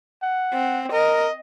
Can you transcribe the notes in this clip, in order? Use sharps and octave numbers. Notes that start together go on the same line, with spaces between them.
F#5
C4
A#4 D#5